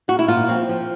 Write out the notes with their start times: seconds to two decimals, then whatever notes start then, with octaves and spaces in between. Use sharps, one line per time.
0.08 A#2 F#4
0.19 E4
0.28 A#2 F4
0.48 F3 C4
0.69 F3